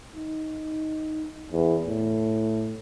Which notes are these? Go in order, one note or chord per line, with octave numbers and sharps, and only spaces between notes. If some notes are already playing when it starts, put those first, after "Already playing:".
D#4
E2
A2